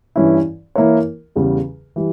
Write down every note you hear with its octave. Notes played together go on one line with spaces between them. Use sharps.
G2 E3 G3 C#4 E4
E3 A#3 E4 A#4 C#5
E2 C#3 G3
E3 G3